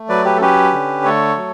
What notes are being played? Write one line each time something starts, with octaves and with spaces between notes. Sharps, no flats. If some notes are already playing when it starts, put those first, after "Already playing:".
Already playing: A3
F#3 B4 D5
G4 B4
A4
C#4 G4 B4
D3
A3 A4 C#5
F#3